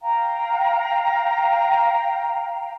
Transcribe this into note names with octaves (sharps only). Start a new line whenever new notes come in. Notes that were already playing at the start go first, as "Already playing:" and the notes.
F5 G5 A#5